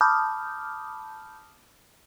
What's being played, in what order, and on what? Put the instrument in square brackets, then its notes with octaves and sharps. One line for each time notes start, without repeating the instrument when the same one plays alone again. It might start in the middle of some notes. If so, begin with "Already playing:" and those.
[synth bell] A5 B5 D6 D#6 F6 G6